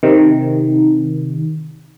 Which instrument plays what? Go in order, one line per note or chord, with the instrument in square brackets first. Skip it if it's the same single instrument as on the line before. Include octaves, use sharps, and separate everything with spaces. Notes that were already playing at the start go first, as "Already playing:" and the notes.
[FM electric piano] C3 D#3